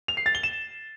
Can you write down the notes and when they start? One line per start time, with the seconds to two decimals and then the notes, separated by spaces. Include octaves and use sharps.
0.08 F7
0.17 C7
0.26 A6
0.35 G7
0.43 E7